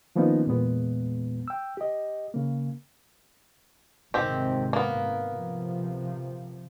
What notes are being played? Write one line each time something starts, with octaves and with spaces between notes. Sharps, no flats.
D#3 F3 A#3 B3 C#4 D#4
E2 A#2 G#3 B3
G5 E6
G4 D#5
C#3 A#3
G#1 G#2 C3 D#3 C4 G4
A#3 B3
C3 F3